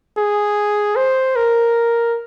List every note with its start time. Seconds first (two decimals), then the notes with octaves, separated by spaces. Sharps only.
0.18 G#4
0.96 C5
1.36 A#4